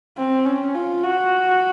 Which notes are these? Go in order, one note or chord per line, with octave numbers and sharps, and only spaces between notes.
C4
C#4
F4
F#4